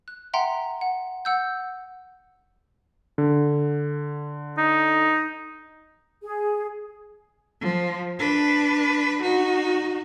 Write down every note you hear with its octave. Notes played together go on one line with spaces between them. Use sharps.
F#6
E5 F#5 G5 A#5 C6
F#5
F#5 E6 G6
D3
D#4
G#4
F3
D4 B4
D#4 F#4